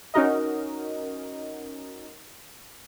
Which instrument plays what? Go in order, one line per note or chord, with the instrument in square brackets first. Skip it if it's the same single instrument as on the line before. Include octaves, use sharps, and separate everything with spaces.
[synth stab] C#4 D#4 F#4 A#4 D#5